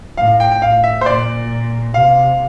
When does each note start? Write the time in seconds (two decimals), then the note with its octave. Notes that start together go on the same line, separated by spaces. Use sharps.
0.17 A2 F5
0.40 G5
0.52 G5
0.62 A2 F5
0.84 E5
1.01 C5
1.06 A#2 D5
1.94 C3 F5